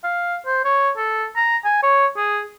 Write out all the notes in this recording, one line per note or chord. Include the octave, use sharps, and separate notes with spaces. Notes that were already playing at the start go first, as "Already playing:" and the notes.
F5
C5
C#5
A4
A#5
G#5
C#5
G#4